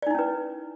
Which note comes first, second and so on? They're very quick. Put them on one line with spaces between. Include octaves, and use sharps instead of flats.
D5 D#4 E4 C#4 B4